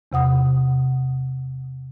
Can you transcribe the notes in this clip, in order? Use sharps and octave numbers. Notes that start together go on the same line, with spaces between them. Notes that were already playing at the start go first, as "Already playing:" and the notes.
E2 C3 F#5 D#6